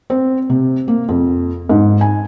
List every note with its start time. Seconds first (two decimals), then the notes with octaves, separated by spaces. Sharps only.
0.10 C4
0.50 C3
0.88 A#3
1.09 F2
1.69 G#2
2.01 G#5